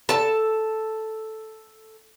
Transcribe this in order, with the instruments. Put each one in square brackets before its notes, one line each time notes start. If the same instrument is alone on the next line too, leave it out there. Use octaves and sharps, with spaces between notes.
[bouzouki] A4 A5